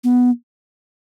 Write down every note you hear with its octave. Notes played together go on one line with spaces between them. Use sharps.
B3